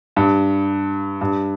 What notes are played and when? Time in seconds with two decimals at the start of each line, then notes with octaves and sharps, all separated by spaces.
0.16 G2
1.21 G2